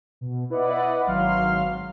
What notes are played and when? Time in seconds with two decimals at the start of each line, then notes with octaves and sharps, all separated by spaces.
0.21 B2
0.50 E4 B4 D5 D#5 F#5
1.07 G#1 F#3 F5 C6 F6